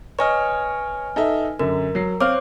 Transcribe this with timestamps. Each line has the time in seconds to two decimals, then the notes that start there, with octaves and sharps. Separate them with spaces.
0.19 B4 C#5 D#5 G#5 F6
1.16 D#4 A4 E5
1.59 F#2 D3 A#4
1.95 F#3 C7
2.20 C4 C5 C#5 F5 D6 F6